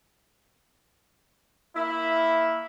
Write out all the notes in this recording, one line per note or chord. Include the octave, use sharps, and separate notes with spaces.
A#3 E4